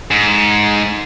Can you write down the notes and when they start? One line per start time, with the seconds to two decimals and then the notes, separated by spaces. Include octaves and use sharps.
0.11 G#2